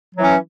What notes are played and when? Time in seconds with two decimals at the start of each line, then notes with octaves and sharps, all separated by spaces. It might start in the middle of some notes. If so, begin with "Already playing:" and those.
0.15 F#3
0.19 E3
0.23 C#4